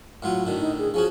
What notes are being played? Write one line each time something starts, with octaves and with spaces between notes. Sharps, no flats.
A2 F#3 F4 F#5
A2 D3 D#3 F#4
D#4
G#4
F3 C#4 F#4 G#4